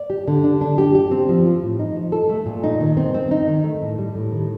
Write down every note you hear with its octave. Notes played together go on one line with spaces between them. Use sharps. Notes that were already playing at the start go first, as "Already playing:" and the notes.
Already playing: D5
G4
D3
D4
D4
G4
G4
C4
F3
F4
A2
D#4
F3
A4
A3
A#2
D#4
D#3
C4
C4
D#4
D#3
A3
A2
G3
A2
D#3